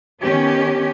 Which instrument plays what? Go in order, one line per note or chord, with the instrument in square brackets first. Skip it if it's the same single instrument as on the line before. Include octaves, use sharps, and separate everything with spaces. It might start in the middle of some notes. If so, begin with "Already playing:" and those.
[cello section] D#3 B3 C#4 G4